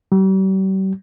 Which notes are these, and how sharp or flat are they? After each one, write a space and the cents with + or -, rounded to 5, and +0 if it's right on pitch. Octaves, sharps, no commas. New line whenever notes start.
G3 -40